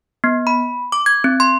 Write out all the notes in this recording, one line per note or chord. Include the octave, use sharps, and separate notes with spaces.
B3
B5
D6
G#6
C4
C6